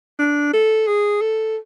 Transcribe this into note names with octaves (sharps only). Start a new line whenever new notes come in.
D4
A4
G#4
A4